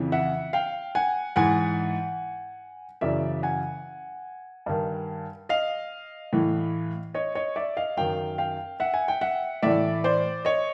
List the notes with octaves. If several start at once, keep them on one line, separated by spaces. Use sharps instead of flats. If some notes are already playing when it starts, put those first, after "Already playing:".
Already playing: F2 C#3 E3
E5 F#5
F5 G5
F#5 G#5
G#2 E3 F#5 G#5
F#2 C#3 E3 D5 E5
F#5 G#5
G2 D#3
D#5 F5
A2 E3
C#5 D#5
C#5 D#5
D5 E5
D#5 F5
F#2 D#3 F5 G5
F5 G5
E5 F#5
G#5
G5
E5 F#5
A2 E3 D5 E5
C5 D5
C#5 D#5